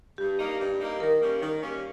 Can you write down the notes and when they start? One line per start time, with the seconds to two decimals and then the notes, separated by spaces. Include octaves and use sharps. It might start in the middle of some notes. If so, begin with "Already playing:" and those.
0.18 G2 G4
0.39 G3 A#3 D#4
0.59 G2
0.80 G3 A#3 D#4
1.00 D#3 A#4
1.21 G3 A#3 C#4
1.41 D#3
1.62 G3 A#3 C#4